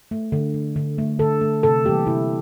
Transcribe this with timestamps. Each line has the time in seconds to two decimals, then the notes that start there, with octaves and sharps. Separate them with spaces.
0.11 A3
0.32 D3
0.54 A3
0.76 D3
0.98 A3
1.19 D3 A4
1.41 A3
1.63 C3 A4
1.84 E3 G3 A#3 G4
2.06 C3 E4